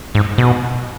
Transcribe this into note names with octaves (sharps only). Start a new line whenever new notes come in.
G#2
B2